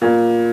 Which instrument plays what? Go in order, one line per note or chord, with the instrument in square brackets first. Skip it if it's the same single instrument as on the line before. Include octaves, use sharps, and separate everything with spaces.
[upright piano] A#2